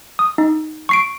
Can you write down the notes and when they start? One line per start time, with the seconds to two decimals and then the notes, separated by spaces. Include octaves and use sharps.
0.19 D#6
0.38 D#4
0.89 C#6 C7 D7